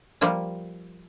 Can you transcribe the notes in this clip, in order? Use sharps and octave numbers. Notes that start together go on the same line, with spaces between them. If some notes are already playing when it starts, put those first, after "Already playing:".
F3 G3 A#3 F4